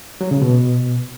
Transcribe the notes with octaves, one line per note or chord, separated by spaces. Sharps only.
F#3
C#3
B2